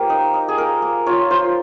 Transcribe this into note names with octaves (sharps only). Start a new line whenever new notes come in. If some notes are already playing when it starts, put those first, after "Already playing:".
Already playing: A#3 F4 G4 C5
D#4
D#4
G#4
A#3 A#4
A#3
F4 C#5
F4 C5